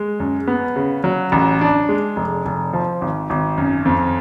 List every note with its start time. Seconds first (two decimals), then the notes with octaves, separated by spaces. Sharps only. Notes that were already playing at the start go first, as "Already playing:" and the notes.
Already playing: G#3
0.20 F#2
0.47 B3
0.76 C#3
1.04 F#3
1.32 A1
1.61 D4
1.89 G#3
2.16 F1
2.45 F1
2.73 F3
3.01 G#1
3.30 G#1
3.58 F#2
3.85 F2